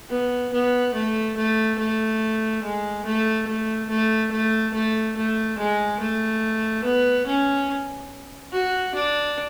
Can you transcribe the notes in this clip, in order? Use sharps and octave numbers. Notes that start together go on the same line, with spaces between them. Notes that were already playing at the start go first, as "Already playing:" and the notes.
B3
B3
A3
A3
A3
G#3
A3
A3
A3
A3
A3
A3
G#3
A3
B3
C#4
F#4
D4